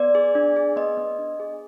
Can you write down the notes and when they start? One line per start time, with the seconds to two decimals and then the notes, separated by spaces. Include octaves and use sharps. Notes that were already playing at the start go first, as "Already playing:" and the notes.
Already playing: B3 D5
0.15 G#4
0.35 D4
0.56 G#4
0.76 B3 D#5
0.97 B3
1.19 D4
1.40 G#4